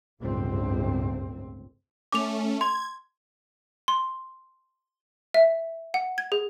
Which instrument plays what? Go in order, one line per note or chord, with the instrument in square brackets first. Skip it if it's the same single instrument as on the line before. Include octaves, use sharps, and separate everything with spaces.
[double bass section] G1 C#2 F#2 A2 C4
[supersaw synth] A3 C#4 [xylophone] D6 F7
[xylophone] C6 [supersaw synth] G#6
[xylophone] C6
E5
F#5
G#6
G#4